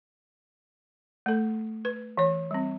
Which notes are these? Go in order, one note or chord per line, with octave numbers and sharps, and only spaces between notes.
A3 A4
B4
E3 C#5
G3 C4